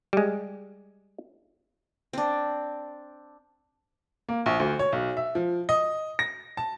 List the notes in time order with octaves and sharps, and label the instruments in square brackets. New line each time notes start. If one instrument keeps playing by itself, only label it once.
[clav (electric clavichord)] G3 G#3
[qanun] C4 D4
[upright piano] A#3
A#1
D2
C#5
B1
E5
F3
D#5
A#6
A5